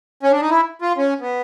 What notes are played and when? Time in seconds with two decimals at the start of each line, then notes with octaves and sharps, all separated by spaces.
0.23 C#4
0.32 D4
0.41 D#4
0.50 E4
0.82 F4
0.97 C#4
1.21 B3